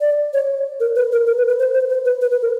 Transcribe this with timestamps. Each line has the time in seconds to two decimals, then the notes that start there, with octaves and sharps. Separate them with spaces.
0.01 D5
0.33 C#5
0.80 A#4
0.96 B4
1.12 A#4
1.27 A#4
1.37 B4
1.48 B4
1.59 C5
1.74 C5
1.90 C5
2.05 B4
2.21 B4
2.31 B4
2.42 A#4